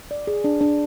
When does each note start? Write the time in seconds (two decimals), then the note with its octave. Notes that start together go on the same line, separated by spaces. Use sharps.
0.11 D5
0.27 G#4
0.44 D4
0.61 D4